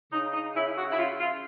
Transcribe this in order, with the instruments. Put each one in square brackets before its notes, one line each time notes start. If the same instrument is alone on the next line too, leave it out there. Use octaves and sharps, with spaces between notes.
[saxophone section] C#3 D#4
D#4
C#3 E4
F#4
E4
C#3 F4
F4